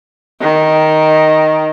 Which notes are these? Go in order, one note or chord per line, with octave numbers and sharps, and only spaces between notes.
D#3